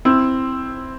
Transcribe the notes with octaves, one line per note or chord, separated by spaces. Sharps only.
C4 E4